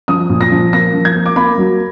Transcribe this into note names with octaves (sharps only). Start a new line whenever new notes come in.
F3 D#6
A#2
A#6
F3
A#3 A#6
F3
G#6
A#3
D6
A#3 B5
F#3